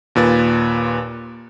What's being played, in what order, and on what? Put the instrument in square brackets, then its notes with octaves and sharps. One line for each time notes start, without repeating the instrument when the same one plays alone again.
[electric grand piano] D#2 A#2 B4 A6